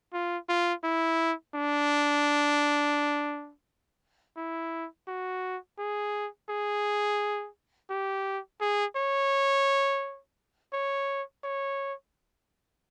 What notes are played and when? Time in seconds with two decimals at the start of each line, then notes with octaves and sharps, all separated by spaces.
0.13 F4
0.49 F4
0.84 E4
1.55 D4
4.37 E4
5.08 F#4
5.78 G#4
6.50 G#4
7.90 G4
8.61 G#4
8.96 C#5
10.73 C#5
11.44 C#5